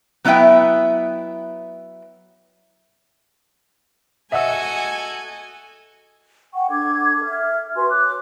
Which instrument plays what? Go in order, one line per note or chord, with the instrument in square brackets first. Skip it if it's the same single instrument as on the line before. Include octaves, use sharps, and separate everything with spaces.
[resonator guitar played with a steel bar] F#3 B3 E4 D#5 E5 G5
[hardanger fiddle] F#4 A4 [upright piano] D#5 [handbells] E5 F#5 E6 [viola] G#5
[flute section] F#5 G5 C#6
D4 A4 D6 G#6
E5 F6
F#4 B4 G#5 C6
C#5 D6 F#6